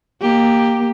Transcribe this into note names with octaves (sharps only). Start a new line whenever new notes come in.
A#3 G4